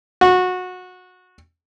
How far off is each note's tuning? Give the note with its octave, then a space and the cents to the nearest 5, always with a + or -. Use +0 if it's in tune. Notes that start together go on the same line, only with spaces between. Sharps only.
F#4 -20